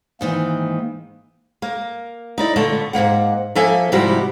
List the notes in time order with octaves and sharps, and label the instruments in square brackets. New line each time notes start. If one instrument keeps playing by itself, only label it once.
[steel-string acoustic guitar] G#2 D#3 E3 [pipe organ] A#3
[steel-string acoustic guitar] A#3
D#4 E4 D5
A#2 D3 A3 B3 A5
G#2 C#3 A#3 F#5
F3 A#3 A4 E5 G#5
G#2 C3 F3 G3 E4 F#4